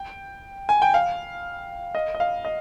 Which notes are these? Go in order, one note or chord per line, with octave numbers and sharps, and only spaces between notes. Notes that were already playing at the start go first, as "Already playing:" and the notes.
Already playing: G5
G#5
G5
F5
D#5
D#5
F5
D#5